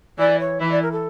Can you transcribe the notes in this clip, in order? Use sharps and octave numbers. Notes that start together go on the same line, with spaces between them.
E3 E4 D5
C#5
E3 E4 E5
D5
A#4
A4